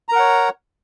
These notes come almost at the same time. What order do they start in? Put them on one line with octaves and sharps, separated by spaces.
A#5 A#4 F#5 C#5